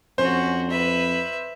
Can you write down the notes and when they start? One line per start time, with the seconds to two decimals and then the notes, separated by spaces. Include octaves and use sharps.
0.18 F2 C#4 F#4 C5
0.69 B4 E5